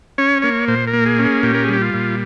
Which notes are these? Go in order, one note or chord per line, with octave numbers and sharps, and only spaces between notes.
C#4 C#5
A#3 C#5
A#2 C5
A#4
A#3
G#4
C#4
G#4
A#2 G4
A#4
G#4
G3 G4
F4
A#2